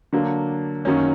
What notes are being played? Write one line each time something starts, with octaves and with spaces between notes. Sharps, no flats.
D3 F#3 A#3 D4
F#2 D#3 F#3 A#3 C#4